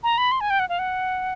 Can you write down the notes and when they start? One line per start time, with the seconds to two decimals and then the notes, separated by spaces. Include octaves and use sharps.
0.03 A#5
0.18 B5
0.32 C6
0.41 G#5
0.50 G5
0.60 F#5
0.69 F5
0.79 F#5